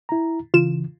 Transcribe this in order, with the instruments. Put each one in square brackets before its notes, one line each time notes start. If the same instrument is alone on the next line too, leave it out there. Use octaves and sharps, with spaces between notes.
[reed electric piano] E4 A#5
[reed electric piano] C#3 E3 [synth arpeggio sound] F4 E7